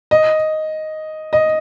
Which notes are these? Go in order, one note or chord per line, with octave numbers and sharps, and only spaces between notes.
D#5
D#5